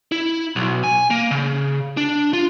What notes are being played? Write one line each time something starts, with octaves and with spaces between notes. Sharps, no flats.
E4
B1
G#5
A#3
C#3
D4
F4